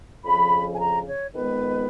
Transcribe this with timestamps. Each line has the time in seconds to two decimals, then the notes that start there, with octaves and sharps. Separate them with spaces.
0.24 F2 C#3 F3 B5
0.73 G#5
0.79 A#5
1.07 C#5
1.33 F2 D#3 G#3 B3 B4